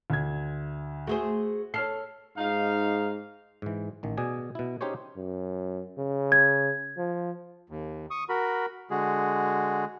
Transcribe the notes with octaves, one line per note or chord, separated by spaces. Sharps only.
D2 G#6
A3 F#4 G#4 C5
A4 C#5 F6 C7
G#2 D#4 F5
G#2 E3
A1 D#3
B2 G#4 D5 G#5
B2 E4
C#4 D#4 G4 G#4 C5 C#5
F#2
C#3
G#6
F3
D#2
C#6 D#6
F#4 A#4 B5
D3 G#3 F#4 G#4